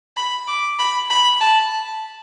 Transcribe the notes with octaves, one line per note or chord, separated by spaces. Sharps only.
B5
D6
B5
B5
A5